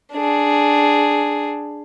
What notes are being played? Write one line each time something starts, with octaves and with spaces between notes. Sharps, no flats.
D4 G#4